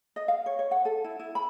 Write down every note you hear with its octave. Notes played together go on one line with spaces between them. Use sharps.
D#5
F5
C#5
C#5
F#5
A4
E4
E4
B5